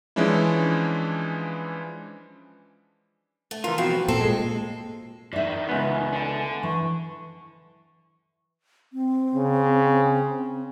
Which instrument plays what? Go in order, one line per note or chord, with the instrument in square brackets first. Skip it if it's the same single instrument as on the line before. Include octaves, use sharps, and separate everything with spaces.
[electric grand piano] E3 F3 G#3 C#4 D4 E4
[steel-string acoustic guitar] A3
[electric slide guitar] E3 F4 [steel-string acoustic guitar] A#4
[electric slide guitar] B2 F3 C4 [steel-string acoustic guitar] F#4
[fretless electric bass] A#2 [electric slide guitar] C4 [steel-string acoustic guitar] A4
[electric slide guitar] G#3
[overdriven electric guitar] D#3 E3 [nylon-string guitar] D5 E5
[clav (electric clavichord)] C#2 B3 [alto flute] G#5
[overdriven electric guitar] D3
[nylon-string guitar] E3 [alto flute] C#6
[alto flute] C4
[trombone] C#3